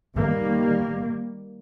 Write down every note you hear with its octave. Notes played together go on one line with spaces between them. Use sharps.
D#3 G3 A#3